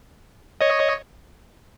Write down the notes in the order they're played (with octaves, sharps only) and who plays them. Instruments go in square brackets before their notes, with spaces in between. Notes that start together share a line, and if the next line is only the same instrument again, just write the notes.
[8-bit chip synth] C#5 D#5